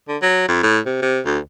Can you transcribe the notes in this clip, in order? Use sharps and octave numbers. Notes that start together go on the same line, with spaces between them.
D3
F#3
F2
A2
C3
C3
D2